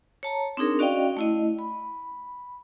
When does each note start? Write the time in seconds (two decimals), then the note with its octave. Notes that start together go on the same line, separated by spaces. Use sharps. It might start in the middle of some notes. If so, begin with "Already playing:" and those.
0.23 C#5 A5 A#5
0.57 C4 D4 D#4 G#4 A#4
0.79 C#4 F#4 D5 D#5 F5 G5
1.17 A3 E4 D#5
1.59 B5